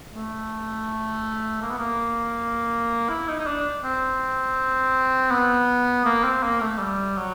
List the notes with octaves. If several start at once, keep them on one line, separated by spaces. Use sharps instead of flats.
A3
A#3
B3
A#3
E4
D#4
D#4
D4
C4
B3
A#3
C4
A#3
A3
G3
F#3